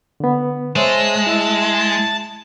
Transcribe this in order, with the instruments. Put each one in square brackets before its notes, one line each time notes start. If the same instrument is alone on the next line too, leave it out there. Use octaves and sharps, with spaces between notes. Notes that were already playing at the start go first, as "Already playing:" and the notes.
[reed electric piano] D3 B3
[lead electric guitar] G#3 [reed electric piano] C5 C#5 E5 [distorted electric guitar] A5
[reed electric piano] E4 E5